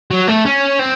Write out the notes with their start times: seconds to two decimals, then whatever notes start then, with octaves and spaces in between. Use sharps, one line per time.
0.11 F#3
0.27 A3
0.45 C#4
0.79 C4